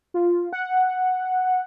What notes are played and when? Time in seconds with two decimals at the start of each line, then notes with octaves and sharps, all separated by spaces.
0.14 F4
0.53 F#5